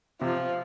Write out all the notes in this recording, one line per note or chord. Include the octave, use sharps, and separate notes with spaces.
C3 F3